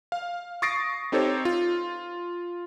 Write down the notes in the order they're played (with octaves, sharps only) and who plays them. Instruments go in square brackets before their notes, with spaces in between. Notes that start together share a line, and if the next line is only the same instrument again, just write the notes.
[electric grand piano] F5
C#6 D#6 A6 A#6 C7 D7
C4 D#4 G4 A4 C5 C#5
F4